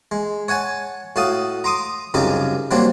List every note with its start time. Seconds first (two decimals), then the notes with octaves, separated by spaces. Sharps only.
0.11 G#3
0.48 C#5 F#5 G#5 A5
1.16 A2 F#4 F5 A5 D#6
1.64 A#5 C6 D6 D#6
2.14 C2 F#2 C#3 D#4 G4 A#5
2.71 F#3 G3 A#3 C4 D4